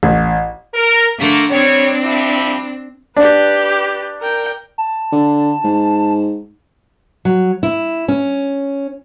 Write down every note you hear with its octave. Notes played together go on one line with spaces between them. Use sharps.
A1
A#4
D3 A3 A#3
G3 C4 D4 C#5
F3 G3 E4
D4 G4 B4
A#4 G5
A5
D3
G#2
F#3
E4
C#4